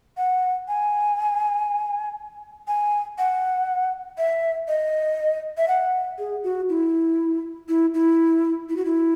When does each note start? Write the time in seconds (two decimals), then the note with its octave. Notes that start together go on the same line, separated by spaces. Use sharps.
0.17 F#5
0.68 G#5
2.68 G#5
3.18 F#5
4.18 E5
4.68 D#5
5.57 E5
5.68 F#5
6.19 G#4
6.44 F#4
6.69 E4
7.69 E4
7.94 E4
8.69 E4
8.77 F#4
8.85 E4